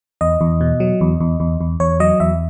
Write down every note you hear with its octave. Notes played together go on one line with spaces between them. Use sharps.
E2 D#5
E2
B2
F#3
E2
E2
E2
E2
E2 C#5
F#3 D#5
E2 E5